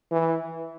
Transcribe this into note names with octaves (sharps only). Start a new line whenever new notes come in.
E3